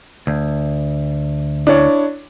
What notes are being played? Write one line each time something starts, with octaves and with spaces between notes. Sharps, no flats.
D2
D4 E4 C#5